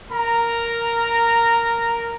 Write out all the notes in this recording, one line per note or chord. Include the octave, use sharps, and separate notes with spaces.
A#4 A#5